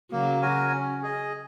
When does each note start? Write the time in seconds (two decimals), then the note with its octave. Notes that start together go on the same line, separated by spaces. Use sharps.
0.12 C#3 F#3 A#3
0.42 F#4 A#4 C#5 G#5
0.72 C#4
1.03 G#4 D#5